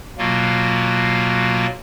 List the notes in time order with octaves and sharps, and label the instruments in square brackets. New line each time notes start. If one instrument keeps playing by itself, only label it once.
[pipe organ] B2 F#3 A#3 F4